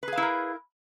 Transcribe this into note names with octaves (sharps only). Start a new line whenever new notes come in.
E4 G#4 A#4 B4 F5